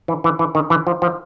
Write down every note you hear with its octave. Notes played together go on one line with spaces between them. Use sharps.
E3
E3
E3
D#3
E3
F3
F3